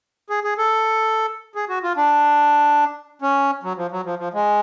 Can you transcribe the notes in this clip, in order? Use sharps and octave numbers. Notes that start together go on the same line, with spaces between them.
G#4
G#4
A4
G#4
F#4
F4
D4
C#4
F#3
F3
F#3
F3
F3
G#3